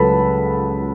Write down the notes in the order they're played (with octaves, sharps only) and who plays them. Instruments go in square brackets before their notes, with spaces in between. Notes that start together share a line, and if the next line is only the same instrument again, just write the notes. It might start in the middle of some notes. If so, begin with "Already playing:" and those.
Already playing: [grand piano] C#2 C#3 F#3 A4 B4 A5 B5